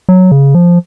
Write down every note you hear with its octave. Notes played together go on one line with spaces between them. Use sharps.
F#3
C#3
F3